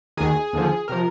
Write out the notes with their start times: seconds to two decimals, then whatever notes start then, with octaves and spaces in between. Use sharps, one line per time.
0.17 D#2 D#3 G#4
0.53 D#2 D3 F3
0.88 C3 F3 A#4